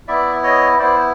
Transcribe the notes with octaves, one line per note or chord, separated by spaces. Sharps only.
B3 E4 D5 E5
C#5 D#5
B3 E4 C5 D5